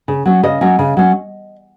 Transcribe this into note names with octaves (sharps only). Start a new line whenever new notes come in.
C#3
F#3 C#4
C#3 D#5
F#3 C#4
C#3
F#3 C#4